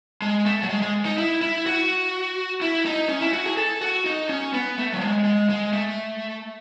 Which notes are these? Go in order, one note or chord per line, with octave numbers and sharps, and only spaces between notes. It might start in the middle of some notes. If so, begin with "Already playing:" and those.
G#3
A3
F#3
G#3
G#3
D#4
E4
E4
F#4
E4
D#4
C#4
E4
F#4
G#4
A4
F#4
D#4
C#4
B3
A3
F#3
G#3
G#3
G#3
A3